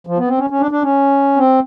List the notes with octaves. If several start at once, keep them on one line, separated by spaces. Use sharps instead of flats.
F3
B3
C4
C#4
C#4
D4
D4
C#4
C4